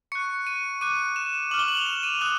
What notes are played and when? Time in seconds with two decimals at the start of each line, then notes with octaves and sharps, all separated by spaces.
0.12 C#6 F#6 C#7
0.47 D#7
0.81 D6 F#6 D#7
1.16 E7
1.51 D6 F6 F#7
1.59 G7
1.68 F#7
1.77 F7
1.86 E7
2.03 D#7
2.21 D#6 F#6 E7